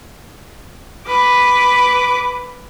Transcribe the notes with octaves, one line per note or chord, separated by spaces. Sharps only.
B4 D6